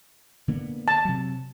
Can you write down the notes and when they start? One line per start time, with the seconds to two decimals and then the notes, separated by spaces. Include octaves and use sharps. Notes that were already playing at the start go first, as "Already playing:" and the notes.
0.48 D3 A#3 B3
0.88 A5
1.05 C3 F#3